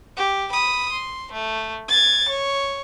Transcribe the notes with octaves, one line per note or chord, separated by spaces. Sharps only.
G4
B5 D#6
C6
A3
G#6 A6
C#5